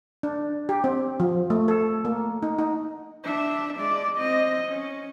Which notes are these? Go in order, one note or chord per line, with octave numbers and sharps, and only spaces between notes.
D4
G4
C4
F3
A3
A4
A#3
D#4
D#4
D4 E5
G#3 D5
C4 D#5
C#4